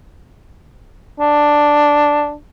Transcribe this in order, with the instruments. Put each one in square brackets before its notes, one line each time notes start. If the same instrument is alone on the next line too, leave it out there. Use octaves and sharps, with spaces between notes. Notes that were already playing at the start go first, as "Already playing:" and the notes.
[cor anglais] D4